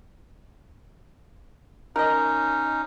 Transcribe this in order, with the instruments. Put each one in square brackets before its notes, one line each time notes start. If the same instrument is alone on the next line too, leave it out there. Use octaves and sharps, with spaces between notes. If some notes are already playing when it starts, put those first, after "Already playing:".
[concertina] C#4 D#4 [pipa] A#4 D#5